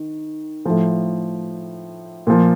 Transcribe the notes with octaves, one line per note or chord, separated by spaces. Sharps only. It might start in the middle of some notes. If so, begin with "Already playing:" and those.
Already playing: D#3
A2 F3
A#2 F3